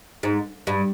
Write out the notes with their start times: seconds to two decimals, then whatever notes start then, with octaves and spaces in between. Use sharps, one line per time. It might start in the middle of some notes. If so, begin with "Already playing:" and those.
0.23 G#2
0.67 G2